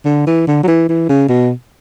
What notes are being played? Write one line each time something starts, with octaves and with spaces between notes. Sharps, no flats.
D3
E3
D3
F#3
E3
E3
C#3
B2